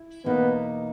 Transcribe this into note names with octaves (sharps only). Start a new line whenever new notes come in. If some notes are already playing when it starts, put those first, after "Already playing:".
Already playing: E4
E2 B2 A#3 B3 D#4